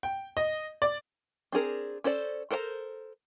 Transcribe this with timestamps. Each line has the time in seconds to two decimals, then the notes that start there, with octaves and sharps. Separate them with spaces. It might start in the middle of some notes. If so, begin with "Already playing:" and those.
0.03 G5
0.37 D#5
0.82 D5
1.52 C4 D4 G#4 A#4
2.04 C#4 A4 C5 D5
2.51 A4 A#4 C5 D5 A#5